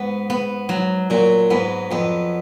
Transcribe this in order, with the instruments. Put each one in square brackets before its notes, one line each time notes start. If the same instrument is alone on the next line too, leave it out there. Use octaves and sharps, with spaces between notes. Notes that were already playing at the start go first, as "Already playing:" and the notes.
Already playing: [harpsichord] G#2 [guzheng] B3
[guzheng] B3
F#3
[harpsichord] A#2 [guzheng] F#3
[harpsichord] G#2 [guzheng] B3
[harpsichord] F2 [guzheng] B3